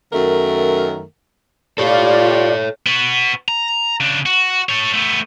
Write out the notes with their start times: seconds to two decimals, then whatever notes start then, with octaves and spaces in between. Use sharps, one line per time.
0.13 F#2 D#3 A3 A#4
1.78 F4 G4 A4 C#5 D5
2.86 B3 F#4
3.48 A#5
4.00 C#3 D4
4.26 F#4
4.69 A4 C#5
4.93 A3 B3